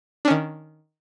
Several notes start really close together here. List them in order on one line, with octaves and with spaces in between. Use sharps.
D4 C#4 D#3